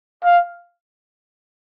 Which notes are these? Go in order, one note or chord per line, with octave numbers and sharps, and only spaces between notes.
F5